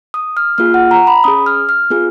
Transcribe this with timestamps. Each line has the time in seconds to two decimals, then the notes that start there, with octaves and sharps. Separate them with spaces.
0.14 D#6
0.37 F6
0.58 A#3 F4 G#4 F6
0.74 F#5
0.91 A#5
1.07 B5
1.24 C#4 G#4 D#6
1.46 F6
1.69 F6
1.90 B3 F4 G#4